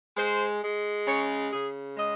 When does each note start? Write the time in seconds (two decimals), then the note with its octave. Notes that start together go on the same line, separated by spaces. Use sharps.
0.16 G#3 C5
0.62 G#3
1.07 C#3 C#5
1.51 C#3 G#4
1.97 G#3 D#5